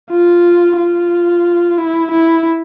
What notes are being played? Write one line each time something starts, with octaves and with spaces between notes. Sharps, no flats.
F4
F4
E4
E4